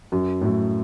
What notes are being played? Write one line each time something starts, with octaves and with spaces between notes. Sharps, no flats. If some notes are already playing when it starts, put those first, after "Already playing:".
F#2
A2
F#2